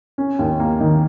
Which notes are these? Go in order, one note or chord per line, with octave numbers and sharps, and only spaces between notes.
C#4
D#2
A#3
D#3